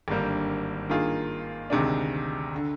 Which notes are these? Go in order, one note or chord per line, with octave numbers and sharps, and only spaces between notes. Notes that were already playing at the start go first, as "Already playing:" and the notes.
G#1 G2 D3 G3 A#3
G2 D#3 A#3 F4 G#4
D2 C3 D#3 G#3 D4
D3